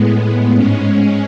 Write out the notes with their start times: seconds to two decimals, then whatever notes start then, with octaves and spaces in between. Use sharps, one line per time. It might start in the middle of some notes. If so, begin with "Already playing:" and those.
Already playing: A2 G#3 B3
0.54 G#2 G#3 C#4